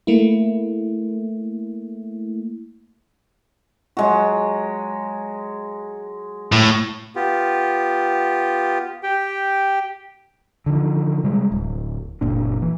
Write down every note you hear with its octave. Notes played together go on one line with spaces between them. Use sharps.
A3 A#3 E4
F#3 G#3 F#4
A2
B3 F4 G4
G4 G5
D3 D#3 F3
C3 G3 G#3
D1
F#1 A#2 D4
E3